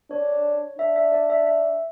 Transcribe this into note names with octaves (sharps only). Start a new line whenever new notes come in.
D4 C#5
D4 E5
E5
D5
E5
E5